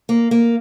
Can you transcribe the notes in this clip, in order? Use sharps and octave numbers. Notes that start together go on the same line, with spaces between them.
A#3
A#3